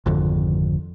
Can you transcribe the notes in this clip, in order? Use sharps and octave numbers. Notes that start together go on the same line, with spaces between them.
G#1 F2 D3